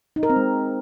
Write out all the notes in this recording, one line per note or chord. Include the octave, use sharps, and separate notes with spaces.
D#4
A#4
C4
G#3